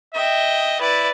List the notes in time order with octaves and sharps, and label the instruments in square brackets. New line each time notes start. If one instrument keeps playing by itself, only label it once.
[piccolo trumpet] D#5 [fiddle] E5 G5
[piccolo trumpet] E4 [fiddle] B4 D5